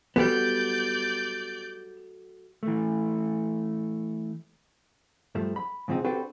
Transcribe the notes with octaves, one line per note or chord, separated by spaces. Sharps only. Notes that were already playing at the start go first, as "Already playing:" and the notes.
G3 B3 F#4 A4 D5 G6
E3 A3
G2 F3 A3
B5
G#2 C#3 F3 B3 C4 D#4
C4 D4 F#4 G4 A4 B4